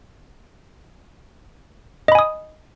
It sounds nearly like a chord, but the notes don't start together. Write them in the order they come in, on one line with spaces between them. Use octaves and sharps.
D#5 B5 G#5 D#6